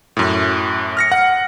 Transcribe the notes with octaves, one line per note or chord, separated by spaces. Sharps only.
F#2 A2
F6 A#6 C#7
F#5